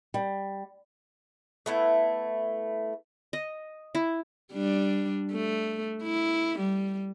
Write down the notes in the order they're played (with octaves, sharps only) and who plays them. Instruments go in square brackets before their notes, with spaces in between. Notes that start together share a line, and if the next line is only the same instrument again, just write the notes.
[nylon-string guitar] G3
[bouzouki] A3 B3 E4
[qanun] D#5
E4
[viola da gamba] G3 D4
A3
E4
G3